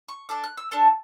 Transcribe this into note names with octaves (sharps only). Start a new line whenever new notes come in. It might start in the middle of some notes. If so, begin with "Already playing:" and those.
C#6
D4 A4 D6
F#6
E6
D4 A4 A5